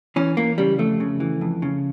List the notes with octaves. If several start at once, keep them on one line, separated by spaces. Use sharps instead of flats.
E3 C#4
E3 A#3
C#3 G3
F2 A3
C#3
E3
F2
C#3